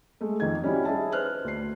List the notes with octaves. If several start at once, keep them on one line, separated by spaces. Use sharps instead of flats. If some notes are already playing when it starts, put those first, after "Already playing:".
G#3 A3
F2 D#3 D#4 G#6
G3 C#4 D#4 E4 F#4 G4
G#4 D#5 E5 A5
B4 C5 F6 F#6
D2 C7